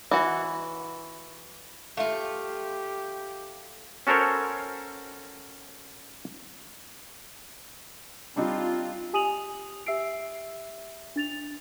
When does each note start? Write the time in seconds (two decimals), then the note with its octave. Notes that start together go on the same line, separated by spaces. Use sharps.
0.11 E3 F#4
1.97 A3 F4 G4 E5 F5
4.07 C#4 F#4 A4 A#4 C5 C#5
8.36 G3 C4 D4 D#4 F4
9.13 G4 G#5 D#6 D#7 F7 F#7
9.86 G4 E5 E6 C7 D7
11.16 D4 A6 F7